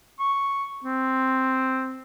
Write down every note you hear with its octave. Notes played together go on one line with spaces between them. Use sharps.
C#6
C4